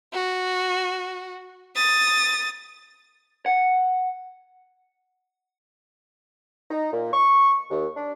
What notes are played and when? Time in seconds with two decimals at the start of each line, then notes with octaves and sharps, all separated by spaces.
0.13 F#4
1.76 D#6 A6
3.46 F#5
6.70 D#4
6.91 A#2
7.13 C#6
7.70 D#2
7.95 D4